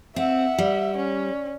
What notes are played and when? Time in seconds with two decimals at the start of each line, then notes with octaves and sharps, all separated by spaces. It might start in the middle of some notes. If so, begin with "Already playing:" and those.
0.16 C4 E5 F#5
0.58 G3
0.97 C#4